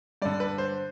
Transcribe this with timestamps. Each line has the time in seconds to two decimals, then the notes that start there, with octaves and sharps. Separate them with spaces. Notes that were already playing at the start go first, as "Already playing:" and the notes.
0.22 G2 D3 D5
0.40 B4
0.58 C5